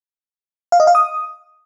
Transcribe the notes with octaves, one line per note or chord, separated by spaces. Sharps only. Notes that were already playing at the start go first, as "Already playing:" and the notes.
F5
D#5
F5
D#6